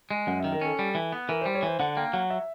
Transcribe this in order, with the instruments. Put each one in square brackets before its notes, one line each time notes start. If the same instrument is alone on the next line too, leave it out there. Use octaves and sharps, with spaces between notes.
[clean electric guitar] G#3
[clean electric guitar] F#2 [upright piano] F#5
[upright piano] E5
[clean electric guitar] D#3
[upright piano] A#4
[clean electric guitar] C#4 [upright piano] A4
[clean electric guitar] G3
E3
B3
[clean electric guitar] E3 [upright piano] A#4
[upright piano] C5
[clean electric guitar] G3
[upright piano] C#5
[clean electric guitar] E3 [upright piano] C5
[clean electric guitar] D3 [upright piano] F#5
[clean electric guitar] A#3 [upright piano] G5
[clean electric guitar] F#3 [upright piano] F#5
[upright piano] E5